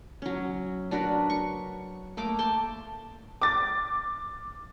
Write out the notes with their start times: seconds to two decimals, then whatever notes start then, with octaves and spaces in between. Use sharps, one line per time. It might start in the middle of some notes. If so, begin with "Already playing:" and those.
0.22 F#3 C#4
0.91 D4 F#4 A#4 B4
1.30 C#6
2.17 A3 A#3 D6
2.39 G5 A5 C6 D6
3.42 D6 A6